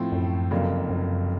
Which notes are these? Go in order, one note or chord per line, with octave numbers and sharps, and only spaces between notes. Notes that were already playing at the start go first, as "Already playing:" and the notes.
Already playing: A2 F3 A3 C4 E4
F#2
F1 F2 C#3 F#3 A#3
F#2